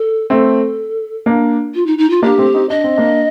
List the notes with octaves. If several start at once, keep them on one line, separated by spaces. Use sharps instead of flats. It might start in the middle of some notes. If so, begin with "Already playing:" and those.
Already playing: A4
A3 C4 A4
A#3 D4
F4
D#4
D#4
F4
A#3 D4 G4
A3 C4
C4 D#4
D4 D#5
C4
A#3 D4